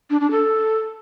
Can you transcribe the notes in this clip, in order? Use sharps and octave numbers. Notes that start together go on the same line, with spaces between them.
D4
D4
A4